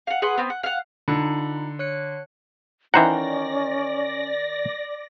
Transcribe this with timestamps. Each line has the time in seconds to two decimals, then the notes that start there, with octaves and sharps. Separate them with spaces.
0.07 F5 F#5
0.22 G#4 B4 F#5 C6
0.37 B3 C4
0.50 F#5
0.63 F5 F#5
1.08 D3 D#4 F4 B5
1.79 C#5 F#6 C#7
2.94 D#3 E3 C#4 C5 D5 F#5 A#5 A#6